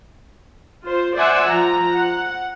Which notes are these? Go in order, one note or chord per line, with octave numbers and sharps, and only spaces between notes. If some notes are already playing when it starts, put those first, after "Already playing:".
F4 C5
C5 D5 E5 F#5 G#5
F3 A#5
F#5